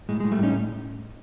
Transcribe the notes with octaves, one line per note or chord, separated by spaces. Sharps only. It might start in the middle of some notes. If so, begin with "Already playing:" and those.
A2 G#3
A2 G#3
G3 A3
A2 C#4 D#4